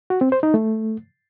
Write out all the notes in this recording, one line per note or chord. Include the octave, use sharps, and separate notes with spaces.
F#4
C4
C5
D#4
A3